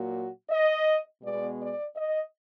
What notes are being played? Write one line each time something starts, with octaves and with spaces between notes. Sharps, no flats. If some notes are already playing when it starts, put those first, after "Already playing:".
Already playing: A#2 F#3 A#3 F#4
D#5
B2 G#3 B3 D5
D5
D#5